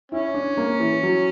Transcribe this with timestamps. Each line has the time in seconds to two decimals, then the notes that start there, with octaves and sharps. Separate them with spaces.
0.12 C#4 E4
0.34 D4
0.57 A#3
0.80 E3
1.03 F#3